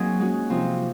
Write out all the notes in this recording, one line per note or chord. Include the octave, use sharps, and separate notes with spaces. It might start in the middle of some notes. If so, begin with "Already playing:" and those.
Already playing: F#3 A#3 C4 D#4 G#4
G#3 C#4 F#4
C3 F3 C4 D#4